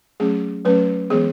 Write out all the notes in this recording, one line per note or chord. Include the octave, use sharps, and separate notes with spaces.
F#3 A3 C#4 G#4
F#3 A3 C#4 B4
E3 G#3 B3 G#4